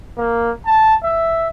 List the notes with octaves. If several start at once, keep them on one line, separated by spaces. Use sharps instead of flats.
A#3
A5
E5